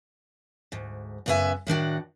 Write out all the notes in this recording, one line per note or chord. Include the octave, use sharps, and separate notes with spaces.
D2 G#2
F#2 C#3 B3 G4 E5 G#5
A2 D#3 D4 F#4